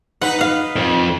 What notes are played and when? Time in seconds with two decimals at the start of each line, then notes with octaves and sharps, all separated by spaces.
0.22 D#4 B4 F#5
0.39 F5 F#5
0.76 F2